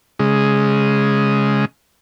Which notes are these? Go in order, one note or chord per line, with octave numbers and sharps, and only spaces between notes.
C#3 G#3